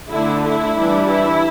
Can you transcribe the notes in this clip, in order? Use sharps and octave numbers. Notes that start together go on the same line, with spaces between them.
D3 A3 D4 E4
E4
E3 G3 D4
E4